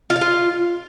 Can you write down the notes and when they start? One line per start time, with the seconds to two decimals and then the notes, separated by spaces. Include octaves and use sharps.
0.10 F4
0.16 F5
0.21 F4